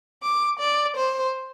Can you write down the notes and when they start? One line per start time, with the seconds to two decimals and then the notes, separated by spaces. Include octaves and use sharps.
0.23 D6
0.60 D5
0.97 C5